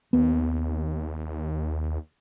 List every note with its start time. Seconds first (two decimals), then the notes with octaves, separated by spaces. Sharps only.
0.13 D#2 B3